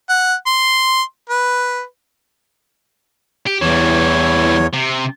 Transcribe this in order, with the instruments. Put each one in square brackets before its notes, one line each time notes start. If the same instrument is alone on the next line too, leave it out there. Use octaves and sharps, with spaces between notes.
[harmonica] F#5
C6
B4
[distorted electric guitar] G4
[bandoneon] E2 C#5 [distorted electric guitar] E3 G3
[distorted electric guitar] C3